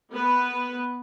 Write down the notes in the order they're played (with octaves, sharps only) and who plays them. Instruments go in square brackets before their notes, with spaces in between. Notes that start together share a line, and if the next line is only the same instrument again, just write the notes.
[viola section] B3 B4